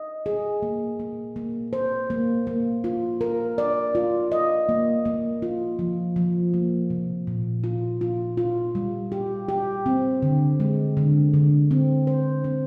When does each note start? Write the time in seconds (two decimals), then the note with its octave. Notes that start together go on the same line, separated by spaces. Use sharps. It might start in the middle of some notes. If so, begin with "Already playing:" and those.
Already playing: D#5
0.26 G#4
0.62 A#3
1.00 A#3
1.36 A#3
1.73 C5
2.10 A#3
2.47 A#3
2.84 F4
3.21 A#4
3.58 D5
3.95 F4
4.32 D#5
4.69 A#3
5.05 A#3
5.42 F4
5.79 F3
6.16 F3
6.54 A#3
6.90 C3
7.27 A#2
7.64 F4
8.01 F4
8.37 F4
8.75 G3
9.12 G4
9.49 G4
9.86 C4
10.22 D3
10.60 G#3
10.97 D3
11.34 D3
11.71 C4
12.07 C5
12.44 C4